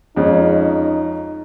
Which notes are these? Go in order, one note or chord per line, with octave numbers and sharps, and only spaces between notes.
F2 G#3 C#4 D#4